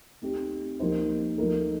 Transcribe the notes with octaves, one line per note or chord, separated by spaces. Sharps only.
A3 C4 D#4 G4
F3 A#3 D#4 G4 C5
F3 A3 D#4 A#4